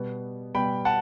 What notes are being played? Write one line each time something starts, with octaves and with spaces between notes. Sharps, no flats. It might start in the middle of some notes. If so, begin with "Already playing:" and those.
Already playing: B2 G3 B3
B2 G3 B3 G5 B5
F#5 A5